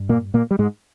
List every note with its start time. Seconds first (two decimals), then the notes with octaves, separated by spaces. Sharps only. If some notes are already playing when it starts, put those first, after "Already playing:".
Already playing: G2
0.09 A#2 A#3
0.34 A#2 A#3
0.51 G3
0.59 G#2 G#3